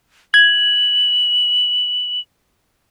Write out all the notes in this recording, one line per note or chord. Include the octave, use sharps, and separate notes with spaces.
G#6 F#7